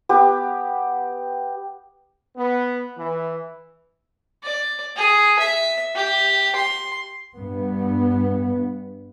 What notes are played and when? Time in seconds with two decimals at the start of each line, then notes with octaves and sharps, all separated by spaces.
0.09 B3 G4
2.36 B3
2.97 E3
4.43 D5
4.96 G#4
5.39 E5
5.95 G4
6.55 C6
7.34 G2 B3